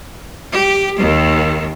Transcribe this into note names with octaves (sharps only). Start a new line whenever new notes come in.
G4
D#2 D#3